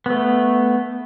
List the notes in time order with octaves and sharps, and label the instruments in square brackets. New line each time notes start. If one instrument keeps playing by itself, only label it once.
[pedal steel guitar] A3 B3